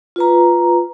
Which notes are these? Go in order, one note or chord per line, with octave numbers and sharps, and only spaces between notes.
F4 B4 A#5